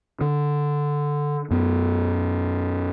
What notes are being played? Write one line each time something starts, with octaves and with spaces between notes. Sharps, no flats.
D3
F#2 B3